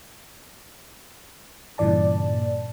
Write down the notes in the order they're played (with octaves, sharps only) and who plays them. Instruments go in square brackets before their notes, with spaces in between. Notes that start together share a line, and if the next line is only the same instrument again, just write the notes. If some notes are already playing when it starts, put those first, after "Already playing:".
[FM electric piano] G2 A#2 C#3 E3 D5 A5